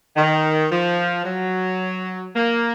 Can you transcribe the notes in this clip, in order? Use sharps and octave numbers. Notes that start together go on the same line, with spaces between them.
D#3
F3
F#3
A#3